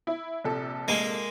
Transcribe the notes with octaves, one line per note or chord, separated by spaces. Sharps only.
E4
A#1 C3 A4
G#3 A#3